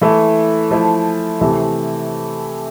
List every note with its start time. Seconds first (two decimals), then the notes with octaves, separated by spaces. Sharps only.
0.01 E3 A3 E4
0.71 F3 A3 E4
1.41 C3 E3 A3